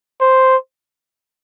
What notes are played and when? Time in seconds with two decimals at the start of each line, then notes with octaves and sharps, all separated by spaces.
0.21 C5